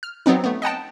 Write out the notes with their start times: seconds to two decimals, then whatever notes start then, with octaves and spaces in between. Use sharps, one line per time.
0.03 F6
0.26 F#3 B3 C4 D#4
0.44 A3 B3
0.62 D#5 F#5 G5 A5